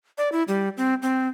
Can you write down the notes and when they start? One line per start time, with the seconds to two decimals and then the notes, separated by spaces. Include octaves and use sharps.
0.18 D5
0.32 E4
0.48 G3
0.77 C4
1.02 C4